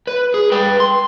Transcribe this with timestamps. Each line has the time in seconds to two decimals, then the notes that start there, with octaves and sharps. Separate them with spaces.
0.07 B4
0.34 G#4
0.52 B4 G5
0.80 C6